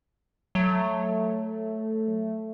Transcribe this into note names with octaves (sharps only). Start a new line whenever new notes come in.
F#3 A3